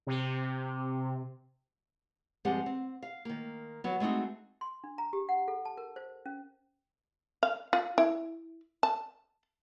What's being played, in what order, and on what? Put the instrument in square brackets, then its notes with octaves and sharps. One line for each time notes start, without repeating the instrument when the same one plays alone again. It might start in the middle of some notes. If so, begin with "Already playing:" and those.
[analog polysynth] C3
[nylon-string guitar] G2 F3 G#3 C4 G4 F#5
C4
F5
D#3 A#3
F#3 B3
G#3 A3 C4 D#4 F#4
[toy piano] C6
D4
A#5
G4
F#5
A4
A5
A#4
C5
C#4
[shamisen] F5
F4
E4
A5